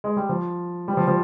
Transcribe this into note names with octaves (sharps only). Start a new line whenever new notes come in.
G#3
G3
F3
G3
F3
F3